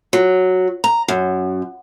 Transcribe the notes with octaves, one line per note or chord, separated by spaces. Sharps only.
F#3
A#5
F#2